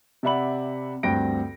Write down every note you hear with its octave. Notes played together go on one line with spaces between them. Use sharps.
C3 D5 E5 F#5 B5 F#7
D2 G2 C4 G5 A#6 D7